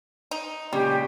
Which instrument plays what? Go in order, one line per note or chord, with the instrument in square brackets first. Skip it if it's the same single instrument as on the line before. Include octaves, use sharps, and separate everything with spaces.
[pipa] D#4
[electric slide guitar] A#2 C#3 [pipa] G3 [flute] G4